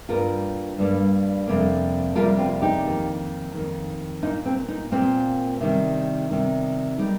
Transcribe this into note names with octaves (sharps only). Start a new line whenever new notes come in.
G2 G3 A#3 F4 A#4
G2 G3 A#3
F2 C3 G3 A#3
F2 C3 G3 A#3 F4 A#4
C4 F4
D#4 G4
F2 D#3 A#3
F2 D#3 A#3
A#2 A#3 D#4
C4
D#4
A#2 A#3 C4
C3 D#3 G3
C3 D#3 G3
G3 A#3 D#4